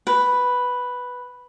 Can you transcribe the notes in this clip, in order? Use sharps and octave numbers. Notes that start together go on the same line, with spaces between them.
B4